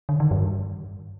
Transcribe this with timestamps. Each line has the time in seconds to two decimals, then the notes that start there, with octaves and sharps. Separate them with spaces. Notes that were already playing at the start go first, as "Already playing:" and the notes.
0.09 D3
0.20 D#3
0.31 G2